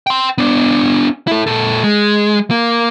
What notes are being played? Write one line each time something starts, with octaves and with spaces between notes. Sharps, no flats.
G5 C6
B3 D4
E4 A4
A#2 A4
G#3
A#3